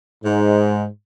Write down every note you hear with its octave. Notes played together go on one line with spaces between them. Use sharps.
G#2